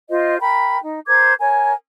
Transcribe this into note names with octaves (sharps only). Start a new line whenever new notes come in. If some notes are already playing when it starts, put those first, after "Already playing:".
F4 C5 D#5
A#4 G5 B5
D#4
A#4 C5 D6 G#6
A#4 C#5 G#5